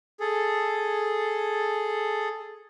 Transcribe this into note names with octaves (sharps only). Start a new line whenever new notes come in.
G#4 A4